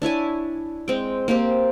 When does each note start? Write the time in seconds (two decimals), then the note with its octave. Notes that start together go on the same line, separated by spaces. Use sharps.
0.02 D4 E4 C#5 G#5
0.88 G#3 C4 G5
1.28 A#3 C4 G4 C5